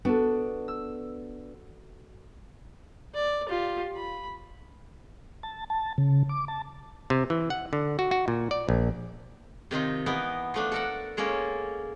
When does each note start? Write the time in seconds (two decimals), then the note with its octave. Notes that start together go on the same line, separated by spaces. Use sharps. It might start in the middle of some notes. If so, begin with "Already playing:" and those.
0.05 B3 D4 F#4 A4
0.68 E6
3.14 D5
3.49 F4 G4
3.95 B5
5.43 A5
5.70 A5
5.98 C#3
6.29 D6
6.48 A5
7.10 C3
7.30 E3
7.50 F#5
7.73 D3
7.99 F#4
8.11 F#4
8.28 A#2
8.51 D5
8.69 A#1
9.71 C3 D#3 D#4 F4
10.06 E3 B3 D#4 A#4
10.54 F3 A3 D4
10.72 A4 A#4 F#5
11.17 G#3 A#3 C#4 A4 A#4